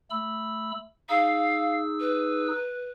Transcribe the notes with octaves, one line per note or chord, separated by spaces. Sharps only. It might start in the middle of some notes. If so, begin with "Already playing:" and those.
A3 B5 E6
D#4 G#4 F5 E6
B4